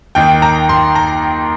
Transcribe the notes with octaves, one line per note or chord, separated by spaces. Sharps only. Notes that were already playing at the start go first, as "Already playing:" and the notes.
D#2 D#3 G5
A#5
C6
A#5